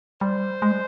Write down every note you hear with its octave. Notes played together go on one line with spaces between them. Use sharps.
G3 C5
G#3
G3